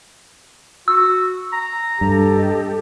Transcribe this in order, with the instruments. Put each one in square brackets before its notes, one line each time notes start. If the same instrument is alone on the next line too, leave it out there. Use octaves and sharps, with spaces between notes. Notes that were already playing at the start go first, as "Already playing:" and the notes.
[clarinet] F#4 [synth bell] E6
[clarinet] A#5
[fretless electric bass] G2 [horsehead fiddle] G4 A4
[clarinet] D#5